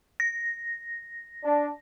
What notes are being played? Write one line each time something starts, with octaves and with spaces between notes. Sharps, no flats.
A#6
D4